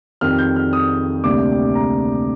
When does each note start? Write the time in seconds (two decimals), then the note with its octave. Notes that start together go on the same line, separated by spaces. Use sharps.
0.21 F2 D#3 G3 F6
0.38 G6
0.56 F6
0.73 D#6
1.24 D2 C3 G3 A#3 D4 D6
1.75 A#5